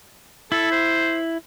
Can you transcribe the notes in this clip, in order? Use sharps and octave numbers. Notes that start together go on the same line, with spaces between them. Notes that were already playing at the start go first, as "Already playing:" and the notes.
E4 A4
C5